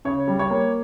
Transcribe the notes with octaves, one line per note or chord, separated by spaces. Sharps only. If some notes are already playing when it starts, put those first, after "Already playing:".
C#3 C#5
G3
C#5
A#3